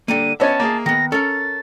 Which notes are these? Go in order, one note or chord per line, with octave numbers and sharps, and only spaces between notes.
D3 G3 A#3 D#7
B3 C#4 C#5 D#5 E5 A5
A#3 G#4
D#3 B3 A#6
C#4 A4 A#4 A6